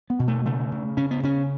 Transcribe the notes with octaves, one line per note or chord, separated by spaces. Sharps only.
B3
B2
A3
C#3 A3
C#3
C#3 C#4
B3
C#3 C#4